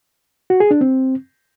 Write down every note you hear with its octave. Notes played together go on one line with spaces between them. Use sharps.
F#4
G#4
D4
C4